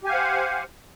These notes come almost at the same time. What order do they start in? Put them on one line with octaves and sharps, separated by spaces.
G4 G#5 F5 F#5 C5